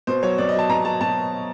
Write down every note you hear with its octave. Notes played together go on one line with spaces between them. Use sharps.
B2 C5
F#3 C#5
B2 D5
D#5
F#3 A5
B2 A#5
F#3 A5
B2 A5